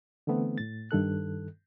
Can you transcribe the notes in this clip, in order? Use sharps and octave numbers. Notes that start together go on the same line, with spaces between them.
D3 E3 A3 B3 C4
A2 A6
G2 D#3 A4 F#6